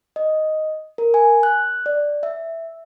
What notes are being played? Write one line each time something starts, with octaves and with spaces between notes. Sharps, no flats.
D#5
A#4
G#5
F#6
D5
E5